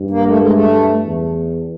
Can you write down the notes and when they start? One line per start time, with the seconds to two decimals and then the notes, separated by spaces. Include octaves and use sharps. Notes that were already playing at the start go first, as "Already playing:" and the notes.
Already playing: G2
0.11 A#3
0.25 A3
0.39 G#3
0.52 A3
1.04 E2